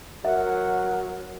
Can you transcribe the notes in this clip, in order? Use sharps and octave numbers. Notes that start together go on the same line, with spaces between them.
F#3 A#4 E5 F#5